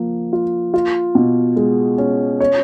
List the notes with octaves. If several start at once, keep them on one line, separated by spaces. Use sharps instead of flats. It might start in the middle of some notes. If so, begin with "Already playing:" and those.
Already playing: F3 A#3
F4
F4
B2
G#3
C#4
C#5